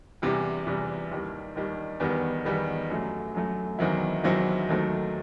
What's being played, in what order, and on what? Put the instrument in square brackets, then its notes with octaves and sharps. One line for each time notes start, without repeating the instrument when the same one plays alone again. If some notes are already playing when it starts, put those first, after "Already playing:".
[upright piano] E2 C3 E3 G3
E2 C3 E3 G3
D#2 D#3 G3
D#2 D#3 G3
E2 D#3 G3 B3
E2 D#3 G3 B3
F#2 F#3 A3
F#2 F#3 A3
E2 D#3 F#3 C4 E4
E2 D#3 F#3 C4 E4
D#2 D#3 F#3 A3 C4